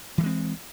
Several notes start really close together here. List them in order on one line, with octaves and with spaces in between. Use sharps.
E3 F#3 G#3 C4